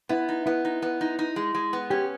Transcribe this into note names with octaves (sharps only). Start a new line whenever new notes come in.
B3 E4
D#4
B3 E4
D#4
B3
D#4
D#4
G#3
G#3
B3
C#4 G4